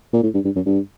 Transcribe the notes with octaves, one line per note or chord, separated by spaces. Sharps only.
A#2
A2
G2
G2
F#2
G2